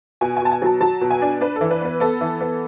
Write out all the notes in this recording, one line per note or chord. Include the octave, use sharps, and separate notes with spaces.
B2 G#5
G#5
B2 A5
G#5
F#3 A5
F#3 A5
B2
G#5
D4
D4 B4
A4
E3
B4
B3 B4
B3 A4
E3
B3